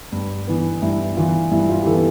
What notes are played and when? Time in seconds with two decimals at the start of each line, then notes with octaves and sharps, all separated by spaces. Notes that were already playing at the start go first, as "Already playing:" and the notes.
0.12 G2
0.47 E3 B3
0.82 G2 E4
1.17 E3 B3 F4
1.51 G2 E4
1.70 F4
1.82 G4
1.86 E3 A4
1.91 B3